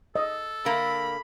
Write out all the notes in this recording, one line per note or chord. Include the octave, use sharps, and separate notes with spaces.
A4 D#5
D3 A#3 B5